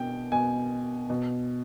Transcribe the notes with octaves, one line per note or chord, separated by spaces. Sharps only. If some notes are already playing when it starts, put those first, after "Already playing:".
Already playing: B2 G5
B2 G#5
B2